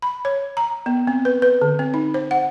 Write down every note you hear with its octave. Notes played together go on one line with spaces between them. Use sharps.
B5
C#5
A#5
B3
C4
B4
B4
D3
C4
D#4
C5
F#5